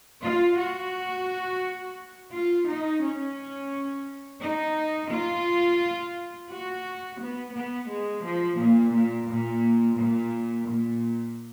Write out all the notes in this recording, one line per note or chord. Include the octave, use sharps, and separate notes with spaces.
F4
F#4
F4
D#4
C#4
D#4
F4
F#4
B3
B3
G#3
F3
A#2
A#2
A#2
A#2
A#2